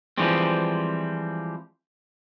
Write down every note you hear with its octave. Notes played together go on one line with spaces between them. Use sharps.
E3 F3 G3 G#3 C4